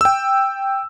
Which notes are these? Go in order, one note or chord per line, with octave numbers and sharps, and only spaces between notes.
G5 E6